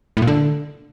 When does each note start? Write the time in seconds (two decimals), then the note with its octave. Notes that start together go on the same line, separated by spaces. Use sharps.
0.17 A2
0.22 A#2
0.27 D3